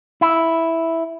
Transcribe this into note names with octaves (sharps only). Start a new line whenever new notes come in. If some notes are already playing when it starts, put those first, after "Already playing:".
E4